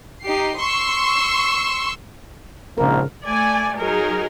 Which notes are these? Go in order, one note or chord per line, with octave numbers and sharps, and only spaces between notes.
D#4 G4 C7
C6 C#6 E6 C7
A#1 G#2 C#3 A#3 A#4
A3 D5 G#5
F#3 D#4 G#4 A#4